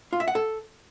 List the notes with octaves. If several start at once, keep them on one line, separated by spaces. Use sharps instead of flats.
F4
E5
F#5
A4